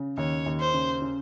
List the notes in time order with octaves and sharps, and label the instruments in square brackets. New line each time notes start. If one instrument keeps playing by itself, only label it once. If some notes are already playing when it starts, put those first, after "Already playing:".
Already playing: [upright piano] C#3
[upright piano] D#2 [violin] C#5
[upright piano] D#2
[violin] C5
[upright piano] C#3
C#3